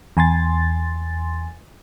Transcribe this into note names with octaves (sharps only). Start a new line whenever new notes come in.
E2 G#5 C6 A6